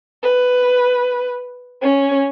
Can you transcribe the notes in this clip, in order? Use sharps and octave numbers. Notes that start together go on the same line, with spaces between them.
B4
C#4